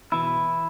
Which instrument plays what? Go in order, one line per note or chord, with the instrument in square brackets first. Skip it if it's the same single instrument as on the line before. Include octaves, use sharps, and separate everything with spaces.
[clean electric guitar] B2 E3 E4